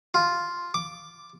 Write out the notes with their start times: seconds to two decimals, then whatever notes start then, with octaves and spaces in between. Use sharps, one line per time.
0.14 F4
0.74 D6